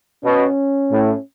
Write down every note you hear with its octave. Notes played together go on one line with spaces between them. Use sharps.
B2 C#4
A2